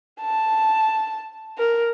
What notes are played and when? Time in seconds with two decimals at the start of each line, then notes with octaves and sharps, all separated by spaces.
0.21 A5
1.58 A#4